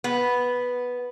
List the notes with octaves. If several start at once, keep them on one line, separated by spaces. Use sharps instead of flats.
B3